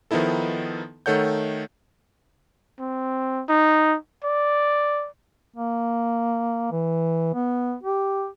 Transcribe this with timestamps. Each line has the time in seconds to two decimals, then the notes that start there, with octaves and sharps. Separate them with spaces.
0.11 D#3 F3 B3 D#4 E4 A4
1.06 D#3 A3 A4 C#5 F#5 G6
2.79 C4
3.49 D#4
4.24 D5
5.56 A#3
6.72 E3
7.34 B3
7.83 G4